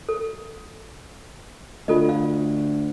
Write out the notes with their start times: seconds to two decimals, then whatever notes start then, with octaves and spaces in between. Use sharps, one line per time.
0.09 A4
1.88 D2 F4 A4 D#5
2.09 F5